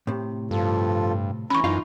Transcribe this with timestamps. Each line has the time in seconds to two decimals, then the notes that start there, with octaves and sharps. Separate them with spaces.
0.07 A2 C3
0.51 G2 F3 F4 A4
1.50 E3 C#4 A#5 B5 C#6
1.64 F#2 D#4 F4